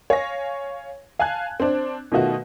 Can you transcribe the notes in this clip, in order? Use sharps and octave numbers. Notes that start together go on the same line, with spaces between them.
C#5 F5 G#5 A#6
F5 G#5 A5 F#6 G#6
C4 D4
B2 D#3 A3 D#4 F4 F#4